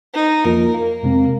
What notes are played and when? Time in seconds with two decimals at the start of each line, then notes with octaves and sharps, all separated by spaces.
0.15 D#4
0.45 F2 F3 A#3 F4 A#4
0.74 A#3
1.03 F2 C3 G#3 C4